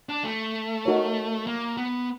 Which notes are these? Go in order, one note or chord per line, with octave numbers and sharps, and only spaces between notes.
D4
A3
D#4 F#4 A#4 C#5
A#3
B3